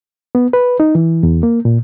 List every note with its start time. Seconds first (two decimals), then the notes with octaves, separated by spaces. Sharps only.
0.35 B3
0.53 B4
0.80 D#4
0.95 E3
1.23 E2
1.43 A#3
1.65 A#2